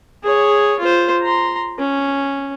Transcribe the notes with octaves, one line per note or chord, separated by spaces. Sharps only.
G#4 C#5
F4 C5
A#5 C6
C#4